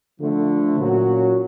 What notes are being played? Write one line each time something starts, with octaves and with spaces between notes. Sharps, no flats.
D3 F3 A3
A#2 F#3 A#3 C#4 F#4